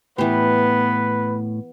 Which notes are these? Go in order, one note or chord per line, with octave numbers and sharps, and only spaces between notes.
A2 E3 B3 G4 B4